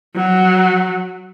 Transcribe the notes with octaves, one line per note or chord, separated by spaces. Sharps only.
F#3